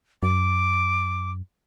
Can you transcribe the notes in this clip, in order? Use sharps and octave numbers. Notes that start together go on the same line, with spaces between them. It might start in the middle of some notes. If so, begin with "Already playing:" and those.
F#2 D6